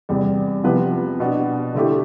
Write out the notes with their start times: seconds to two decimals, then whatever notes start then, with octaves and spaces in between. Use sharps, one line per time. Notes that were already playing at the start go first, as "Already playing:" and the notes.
0.09 E2 C3 G3
0.64 C3 F3 B3 E4 B4
1.20 B2 B3 D4
1.75 D3 A3 E4 G4